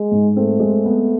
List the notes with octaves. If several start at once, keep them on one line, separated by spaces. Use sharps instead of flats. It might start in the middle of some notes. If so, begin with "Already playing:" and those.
Already playing: G#3
G#2
A3 C4
G#3
B3